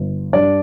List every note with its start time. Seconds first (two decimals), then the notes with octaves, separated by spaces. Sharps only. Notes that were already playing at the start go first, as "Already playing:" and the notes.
Already playing: G1
0.33 G2 G3 D4 D5